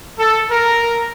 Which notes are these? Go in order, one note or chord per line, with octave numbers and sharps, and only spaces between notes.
A4
A#4